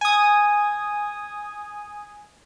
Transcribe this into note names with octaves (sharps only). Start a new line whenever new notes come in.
G#5 D#6